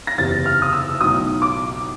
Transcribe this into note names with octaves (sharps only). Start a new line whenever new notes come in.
A#6
F#1 E2 C3 A6
F6
D#6
E6
B1 A2 F#3 D#6
D6